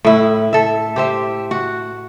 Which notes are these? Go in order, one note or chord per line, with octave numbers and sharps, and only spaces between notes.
A2 E4
A4 E5
G4 C5 E5
F#4